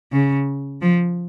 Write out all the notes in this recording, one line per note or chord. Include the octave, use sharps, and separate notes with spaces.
C#3
F3